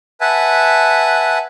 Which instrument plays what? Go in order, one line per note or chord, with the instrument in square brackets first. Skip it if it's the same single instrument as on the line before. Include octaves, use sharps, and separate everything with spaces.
[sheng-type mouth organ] B4 E5 F#5 G#5 A5